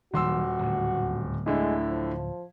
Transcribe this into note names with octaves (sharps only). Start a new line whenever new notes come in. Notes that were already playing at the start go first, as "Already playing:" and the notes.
D#1 D#3 F#3 A#3 F#4 C6 E6
D1 D2
A2 D3 G#3 E4
F3